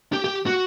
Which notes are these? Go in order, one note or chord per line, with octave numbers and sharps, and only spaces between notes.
G4
G4
F#4